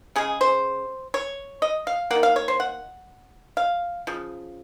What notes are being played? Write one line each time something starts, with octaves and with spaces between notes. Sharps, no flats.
C#3 G#3 G#4
C5
C#5
D#5
F5
D#3 A#3 F#5
F5
C#5
C5
F#5
F5
C#3 F3